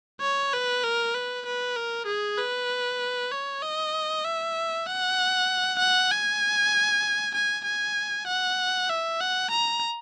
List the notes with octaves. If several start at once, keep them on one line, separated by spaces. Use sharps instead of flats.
C#5
B4
A#4
B4
B4
A#4
G#4
B4
C#5
D#5
E5
F#5
F#5
G#5
G#5
G#5
F#5
E5
F#5
A#5